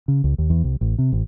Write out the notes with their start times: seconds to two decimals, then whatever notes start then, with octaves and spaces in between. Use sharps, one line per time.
0.08 C#3
0.24 C#2
0.38 D#2
0.50 E2
0.64 C2
0.81 A1
0.98 C3
1.12 A1